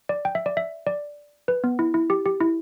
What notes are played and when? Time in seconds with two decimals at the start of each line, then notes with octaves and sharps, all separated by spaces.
0.09 D5
0.25 G5
0.35 E5
0.46 D5
0.57 E5
0.87 D5
1.48 B4
1.64 B3
1.79 E4
1.94 E4
2.10 G4
2.26 G4
2.40 E4